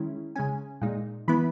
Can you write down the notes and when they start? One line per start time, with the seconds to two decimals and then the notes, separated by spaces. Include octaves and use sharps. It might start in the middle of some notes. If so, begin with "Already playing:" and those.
Already playing: D#3 G#3 C#4 E4
0.36 C#3 G#3 C#4 G#5
0.81 A#2 G#3 D#4
1.28 E3 B3 E4 B5